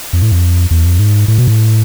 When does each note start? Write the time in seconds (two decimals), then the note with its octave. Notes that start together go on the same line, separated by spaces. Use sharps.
0.13 F2
0.22 A2
0.32 F2
0.71 E2
0.85 F2
0.99 G#2
1.28 A2
1.38 B2
1.48 A2